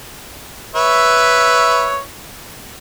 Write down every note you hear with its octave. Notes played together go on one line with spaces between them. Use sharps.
B4 C#5 E5